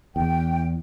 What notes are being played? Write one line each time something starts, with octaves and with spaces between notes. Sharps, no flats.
E2 G5